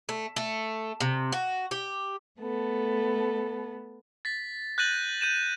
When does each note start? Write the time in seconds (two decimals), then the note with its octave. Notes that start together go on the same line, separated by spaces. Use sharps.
0.09 A3
0.36 A3
1.00 C3
1.32 F#4
1.71 G4
2.40 A3 B3 A4
4.25 A6 B6
4.78 F#6 G6 A6 A#6 D#7 F#7
5.21 G6 D#7 E7